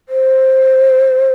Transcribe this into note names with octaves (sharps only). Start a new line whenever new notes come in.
C5